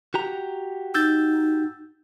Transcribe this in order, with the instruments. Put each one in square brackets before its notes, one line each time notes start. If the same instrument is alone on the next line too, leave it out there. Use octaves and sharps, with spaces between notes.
[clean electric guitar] F#4 G4 A#5
[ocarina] D#4 [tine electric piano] E6 G6 A6